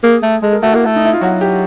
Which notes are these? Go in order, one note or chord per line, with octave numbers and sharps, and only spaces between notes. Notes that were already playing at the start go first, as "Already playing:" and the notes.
A#3 G#4
A3
G#3 A4
A#4
A3 F#4
A#3 E4
A3
D#4
E4
F4
F#3 F#4
G4